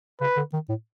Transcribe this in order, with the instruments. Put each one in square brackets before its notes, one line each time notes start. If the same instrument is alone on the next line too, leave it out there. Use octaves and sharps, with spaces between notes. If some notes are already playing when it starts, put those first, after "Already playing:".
[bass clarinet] C#3 [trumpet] B4
[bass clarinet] D3
D#3
A2